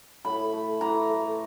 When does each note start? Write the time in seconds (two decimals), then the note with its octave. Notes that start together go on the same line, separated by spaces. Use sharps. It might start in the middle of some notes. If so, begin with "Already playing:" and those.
0.25 A2 B5
0.53 A3
0.81 E3 A#5
1.09 A3